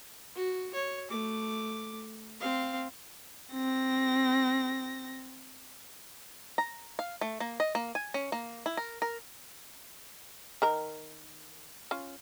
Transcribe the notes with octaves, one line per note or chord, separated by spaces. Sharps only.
F#4
C#5
A3 D6
C4 F5
C4 A#6
A#5
F5
A3
A#3
D#5
A#3
G#5
C#4
A#3
E4
A#4
A#4
D#3 A#4 A#5
C#4 F4